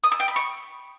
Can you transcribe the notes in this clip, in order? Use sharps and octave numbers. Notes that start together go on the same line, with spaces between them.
D#6
E6
G5
B5
C#6